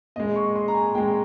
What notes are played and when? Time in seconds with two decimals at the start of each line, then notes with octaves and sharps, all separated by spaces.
0.16 A#2 G#3 D#5
0.36 C#6
0.55 C6
0.68 A#5
0.75 G#5
0.95 A#2 G#3 G5